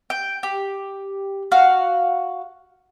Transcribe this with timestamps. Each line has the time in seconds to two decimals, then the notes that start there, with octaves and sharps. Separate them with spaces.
0.10 G5
0.43 G4
1.52 F#4 F5